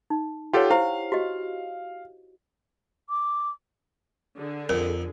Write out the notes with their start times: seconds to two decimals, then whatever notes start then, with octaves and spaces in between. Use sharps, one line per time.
0.10 D#4
0.53 F4 G4 A4 C#5 F#5 G5
0.71 E4 G4 C5 F5
1.12 F#4 G4 D#5
3.10 D6
4.39 D3 G#4
4.69 F2 A#4